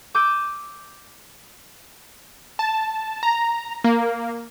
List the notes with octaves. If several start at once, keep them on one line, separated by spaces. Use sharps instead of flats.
D6 E6 G6 D7 D#7
A5
A#5
A#3